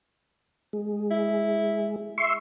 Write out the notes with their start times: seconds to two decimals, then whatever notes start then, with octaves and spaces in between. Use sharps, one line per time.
0.73 G#3
1.10 E4
2.18 E5 C6 C#6